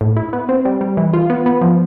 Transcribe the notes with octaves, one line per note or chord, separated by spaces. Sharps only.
A2
E4
B3
C4
G3
G3
E3
F4
B3
B3
F3